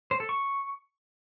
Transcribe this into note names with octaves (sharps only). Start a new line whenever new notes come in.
C5
A4
C#6